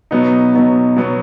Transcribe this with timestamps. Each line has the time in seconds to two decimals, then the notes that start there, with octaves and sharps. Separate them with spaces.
0.11 B2 F#3 B3 D#4
0.54 B2 F#3 B3 D#4
0.96 B2 F#3 B3 D#4